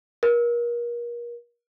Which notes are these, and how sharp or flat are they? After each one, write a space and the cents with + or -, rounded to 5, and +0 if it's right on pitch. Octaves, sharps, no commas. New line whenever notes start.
A#4 +35